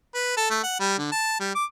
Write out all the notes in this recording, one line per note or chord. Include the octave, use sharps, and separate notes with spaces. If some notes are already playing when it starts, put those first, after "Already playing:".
B4
A4
A3
F#5
G3
D3
A5
G3
D6